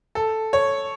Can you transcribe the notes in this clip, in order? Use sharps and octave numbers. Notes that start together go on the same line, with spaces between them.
A4
C#5